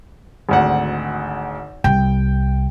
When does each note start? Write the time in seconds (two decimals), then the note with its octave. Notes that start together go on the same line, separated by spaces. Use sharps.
0.49 G#1 D2 F#5
1.84 C2 G5